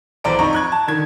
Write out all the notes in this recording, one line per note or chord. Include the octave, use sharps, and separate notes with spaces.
B1 E3 C5 D5 A#5 D7
F2 D#4 A#5 C#6
C#6 F#6 G#6
A5
D3 D#3 G#6